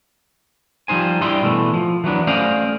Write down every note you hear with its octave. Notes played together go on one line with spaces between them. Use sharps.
F3 G3 D#4 C5 G#5
G2 G3 E4 D5 D#5 C6
B2 E3 A3
F3
E3 F#3 B3 D4
A3 C#4 C5 D5 D#5 F5